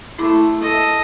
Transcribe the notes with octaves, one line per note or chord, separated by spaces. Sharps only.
A3 E4 B5 D6
A4 D#5